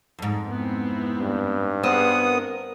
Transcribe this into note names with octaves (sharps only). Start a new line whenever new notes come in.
F2 G#2
B3 C4 E4
G2
B3 C4 G#4 F#5 D#6
A#4